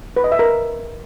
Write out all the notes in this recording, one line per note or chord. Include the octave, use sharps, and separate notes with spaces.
B4
D#5
E5
A#4